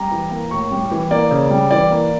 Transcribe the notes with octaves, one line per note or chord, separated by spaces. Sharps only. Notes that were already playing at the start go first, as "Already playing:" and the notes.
Already playing: G3 A#5
E3
A#3
A2 C#6
G3
E3
A#3 D5
C#3
G3
E3 D5
A#3